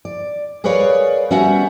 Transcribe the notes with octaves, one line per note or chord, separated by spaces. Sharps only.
D5
G#4 A#4 B4 C#5 D5 F5
G3 B3 C#4 F#4 E5 F#5